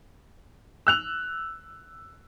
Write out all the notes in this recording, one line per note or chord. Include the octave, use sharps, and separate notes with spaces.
E6 F#6 F7